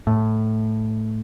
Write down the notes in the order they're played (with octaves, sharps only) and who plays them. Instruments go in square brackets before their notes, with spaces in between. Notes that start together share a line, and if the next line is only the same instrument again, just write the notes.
[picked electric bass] A2